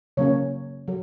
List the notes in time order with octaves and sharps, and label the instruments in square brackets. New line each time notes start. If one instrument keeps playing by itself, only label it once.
[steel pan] C#3 F#3 A#3 C#4 C#5
F#3